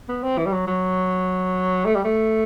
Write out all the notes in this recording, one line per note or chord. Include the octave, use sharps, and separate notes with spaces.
B3
C4
E3
G3
F#3
F#3
A3
G3
A3